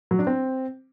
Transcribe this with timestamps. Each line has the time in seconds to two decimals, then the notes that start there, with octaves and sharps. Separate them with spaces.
0.11 F#3
0.19 D4
0.27 C4